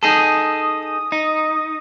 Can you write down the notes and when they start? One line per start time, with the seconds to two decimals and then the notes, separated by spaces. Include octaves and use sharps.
0.03 D#4 G#4 A4 D#6
1.12 D#4